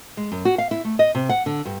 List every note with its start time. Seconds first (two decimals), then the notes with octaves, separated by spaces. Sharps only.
0.17 G#3
0.32 F#2
0.45 F#4
0.58 F5
0.71 E4
0.85 A3
0.99 D#5
1.15 C3
1.29 F#5
1.46 D3
1.65 G2